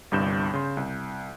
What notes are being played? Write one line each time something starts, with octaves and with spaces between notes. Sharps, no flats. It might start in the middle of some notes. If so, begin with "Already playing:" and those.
G1 C2 G2 G6 E7
C#3 C6
C2